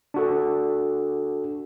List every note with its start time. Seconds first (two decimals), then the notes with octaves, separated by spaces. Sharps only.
0.14 D4 F#4 A4